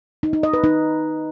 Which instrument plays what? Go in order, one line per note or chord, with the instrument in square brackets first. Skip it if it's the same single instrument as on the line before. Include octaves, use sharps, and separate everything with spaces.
[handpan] D#4
D#4
D#5
B4
D#4